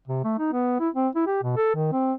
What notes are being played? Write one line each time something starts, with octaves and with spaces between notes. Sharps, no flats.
C3
A3
D#4
B3
E4
C4
E4
G4
B2
A4
D#3
C4